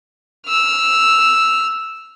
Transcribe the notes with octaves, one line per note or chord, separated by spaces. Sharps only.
E6 F6